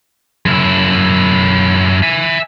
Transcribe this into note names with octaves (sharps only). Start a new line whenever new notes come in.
F#2 E4
E5 G#5